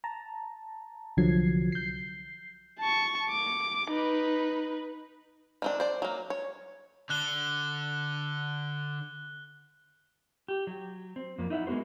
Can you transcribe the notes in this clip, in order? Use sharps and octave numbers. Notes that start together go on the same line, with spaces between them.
A5 A#5
C2 D3 F3 F#3 G#6 C7
G6 C7
A5 C#6
D6
D#4 B4
D#3 C4 D4
C5 D5
F#3 A#3
C#5
D3 F#6 G7
G4
F#3
C4
F2 A#3
D#4 E4 E5 F#5
G#3 A#3 B3 F#4 C5